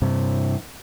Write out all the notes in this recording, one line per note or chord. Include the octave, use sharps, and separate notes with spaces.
G2 C3